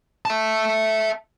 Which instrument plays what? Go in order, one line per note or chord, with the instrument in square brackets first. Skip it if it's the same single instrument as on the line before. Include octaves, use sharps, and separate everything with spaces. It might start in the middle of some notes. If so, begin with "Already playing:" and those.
[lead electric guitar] E5 A5